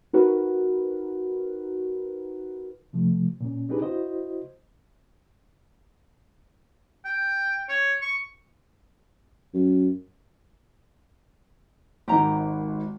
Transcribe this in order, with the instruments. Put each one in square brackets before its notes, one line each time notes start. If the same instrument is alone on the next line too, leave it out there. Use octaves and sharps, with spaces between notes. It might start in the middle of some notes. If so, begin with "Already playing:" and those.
[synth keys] D#4 F#4 A#4 B4
[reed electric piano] C3 F3 A3
A#2 C#4
C4 D4 D#4 G4 G#4 B4
E4 F#4 C5 D#5
[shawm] G5
C#5
C#6
[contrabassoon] F#2
[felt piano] G#1 D#3 [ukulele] G4 F#5 A#5